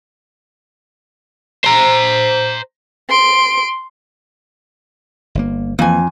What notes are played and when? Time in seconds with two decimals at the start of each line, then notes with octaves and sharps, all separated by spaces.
1.65 C5 A#5
3.09 C6 D7
5.35 G1 A#3
5.79 F2 E3 A#3 G#5